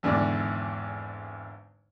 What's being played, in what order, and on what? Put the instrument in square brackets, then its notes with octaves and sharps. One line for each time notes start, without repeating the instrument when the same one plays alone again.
[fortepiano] G#1 E2 G#2 D3 D5